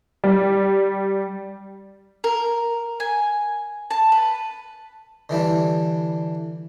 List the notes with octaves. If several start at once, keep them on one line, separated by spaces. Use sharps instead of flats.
G3
A#4
G#5
A5
B4
D3 E3 G3 D4